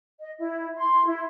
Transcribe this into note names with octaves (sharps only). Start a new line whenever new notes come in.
D#5
E4
C6
E4